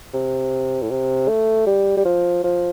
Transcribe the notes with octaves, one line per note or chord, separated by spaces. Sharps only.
C3
A2
C3
A3
G3
G3
F3
F3